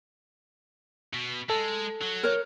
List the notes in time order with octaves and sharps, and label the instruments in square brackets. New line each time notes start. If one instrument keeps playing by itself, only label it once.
[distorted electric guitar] B2
[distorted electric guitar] G#3 [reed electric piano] A4
[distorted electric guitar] F#3
[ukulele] A#4 C#5